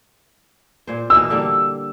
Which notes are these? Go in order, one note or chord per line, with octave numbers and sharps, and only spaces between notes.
A#2 C5
B2 E3 A#3 E6
D3 G3 A#3